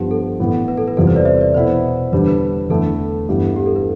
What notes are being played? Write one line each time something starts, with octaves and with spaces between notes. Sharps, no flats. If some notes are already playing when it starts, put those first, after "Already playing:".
Already playing: G2 F3 B3 G4
A4
A2 E3 B3 E4
B4
A4
B4
E2 C3 G3 C4 F4 A4
C5
B4 D5
C5 E5
B4 D5
B2 B3 E4 C5
E2 D3 G3 D4 B4
B4
E2 D3 A3 E4 A4
G2 E3 G3 B3
G4
A4
B4